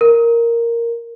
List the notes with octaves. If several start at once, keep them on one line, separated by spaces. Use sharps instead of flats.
A#4